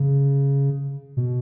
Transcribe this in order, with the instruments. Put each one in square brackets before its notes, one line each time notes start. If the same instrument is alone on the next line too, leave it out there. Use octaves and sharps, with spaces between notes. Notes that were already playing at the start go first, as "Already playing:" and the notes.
Already playing: [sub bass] C#3
B2